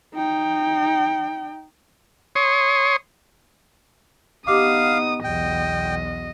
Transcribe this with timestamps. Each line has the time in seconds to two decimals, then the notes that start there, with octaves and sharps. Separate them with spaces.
0.14 D#4 G5
2.35 C#5 C6 C#6 D#6
4.47 B3 D#4 G4 F5 D6 D#6
5.24 B1 E2 D#5 G5